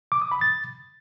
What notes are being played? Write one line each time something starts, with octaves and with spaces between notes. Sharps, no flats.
D6
D#6
B5
A6